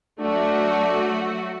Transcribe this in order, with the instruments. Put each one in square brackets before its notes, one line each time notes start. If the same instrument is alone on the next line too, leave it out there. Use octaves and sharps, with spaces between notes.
[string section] F#3 A3 F#4 [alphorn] D4